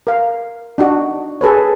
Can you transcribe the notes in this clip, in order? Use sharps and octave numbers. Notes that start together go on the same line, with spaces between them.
A#4 F5
D4 D#4 F#4
G#4 A4 B4 C#5